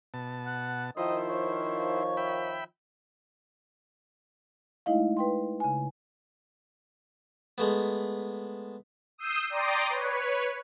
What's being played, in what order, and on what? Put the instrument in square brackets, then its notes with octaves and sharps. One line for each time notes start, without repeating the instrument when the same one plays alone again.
[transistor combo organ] B2 A5
[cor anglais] F#5
[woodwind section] D#3 F3 [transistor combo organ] E4 C5 [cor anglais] D#5
[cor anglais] C#5
[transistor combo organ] E5 G5 B5
[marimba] G#3 A3 D#4 E4 D#5 F5
B4 G5 C6
C#3 G#5
[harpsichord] G#3 A3 B3
[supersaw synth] D#6 E6 G6 C7 D#7
D5 G5 A#5 C6 D6 D#6
B4 C#5